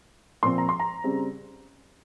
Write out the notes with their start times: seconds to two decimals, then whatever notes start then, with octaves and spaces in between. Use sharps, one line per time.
0.43 A#2 F3 C4 C6
0.58 A#5
0.69 C6
0.80 A#5
1.04 C#3 G3 C4